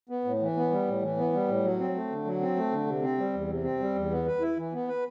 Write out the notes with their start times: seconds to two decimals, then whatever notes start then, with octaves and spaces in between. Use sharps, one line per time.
0.09 B3
0.25 A2
0.41 E3
0.57 B3
0.71 G3
0.87 A2
1.02 E3
1.17 B3
1.33 G3
1.48 A2
1.64 F#3
1.79 C4
1.95 A3
2.10 D3
2.25 F#3
2.40 C4
2.56 A3
2.71 D3
2.87 C3
3.02 C4
3.18 G3
3.34 E2
3.48 C3
3.64 C4
3.80 G3
3.95 E2
4.10 B3
4.26 B4
4.41 E4
4.57 E3
4.72 B3
4.87 B4